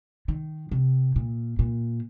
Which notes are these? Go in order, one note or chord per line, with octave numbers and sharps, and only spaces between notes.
D#3
C3
A#2
A#2